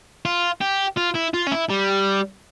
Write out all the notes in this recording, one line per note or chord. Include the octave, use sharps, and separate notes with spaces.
F4
G4
F4
E4
F4
C#4
E4
G3